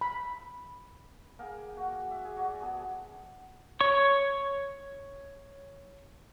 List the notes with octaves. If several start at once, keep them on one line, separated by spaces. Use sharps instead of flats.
B5
A#3 G#4 A#4 G5
F#4
E5
G#4
F#4 D5
B3 G#4 A5
C#5 C#6